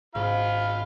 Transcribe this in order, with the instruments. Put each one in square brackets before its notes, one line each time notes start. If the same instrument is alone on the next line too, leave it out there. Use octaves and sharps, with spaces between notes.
[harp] G#1 [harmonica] F4 F5 B5